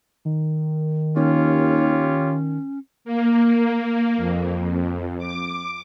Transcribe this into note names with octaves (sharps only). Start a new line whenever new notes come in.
D#3
D#2 C#4 F4 G4 C#5
A#3
F2
D6